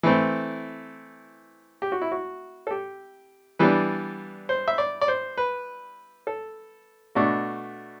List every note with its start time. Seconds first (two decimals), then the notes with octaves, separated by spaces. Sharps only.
0.03 E3 A3 C4 E4
1.82 G4
1.92 F#4
2.01 E4
2.12 F#4
2.67 A4
2.71 G4
3.59 E3 G3 B3 D4 B4
4.49 C5
4.68 E5
4.78 D5
5.01 D5
5.08 C5
5.38 B4
6.27 A4
7.15 B2 A3 D4 F#4